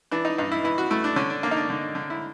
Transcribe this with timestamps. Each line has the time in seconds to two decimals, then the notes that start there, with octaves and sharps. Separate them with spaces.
0.11 E3 D4
0.25 D#4
0.38 G2 D#4
0.52 E4
0.64 E3 E4
0.78 F#4
0.91 A3 E4
1.04 D4
1.16 D3 C#4
1.30 D4
1.43 A#3 D4
1.51 D#4
1.57 D4
1.70 D3
1.95 D3
2.10 E4